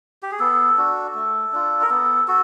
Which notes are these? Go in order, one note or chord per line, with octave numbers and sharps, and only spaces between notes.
G4
G#4
B3 A4
D4 F#4
A3
D4 F4
A#4
B3 A4
F#4 A4